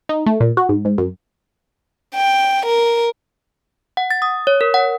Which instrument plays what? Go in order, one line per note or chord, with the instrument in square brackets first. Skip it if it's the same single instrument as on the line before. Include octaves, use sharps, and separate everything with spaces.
[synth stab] D#4
A3
A#2
F#4
G#2
G#2
F#2
[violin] G5
A#4
[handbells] F#5
A6
D#6
C#5
A#4
F#5